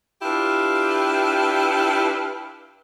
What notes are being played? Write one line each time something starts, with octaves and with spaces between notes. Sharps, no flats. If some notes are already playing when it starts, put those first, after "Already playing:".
D4 E4 F4 G4 B4